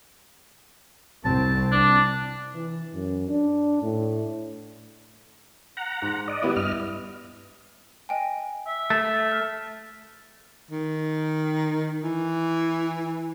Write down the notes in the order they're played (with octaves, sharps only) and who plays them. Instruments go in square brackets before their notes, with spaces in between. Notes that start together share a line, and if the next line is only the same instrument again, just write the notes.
[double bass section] C2 C4 [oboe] A5
[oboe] D4
[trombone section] E3
F#2
D4
A2
[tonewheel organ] F#5 A#5
[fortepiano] G#2
[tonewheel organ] D5 D#5
[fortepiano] G3 B3 E4
[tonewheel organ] G2 D#5 F6
[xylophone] D#5 G5 G#5
[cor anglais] E5
[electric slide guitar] A3 [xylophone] A6
[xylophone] F6
[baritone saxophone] D#3
E3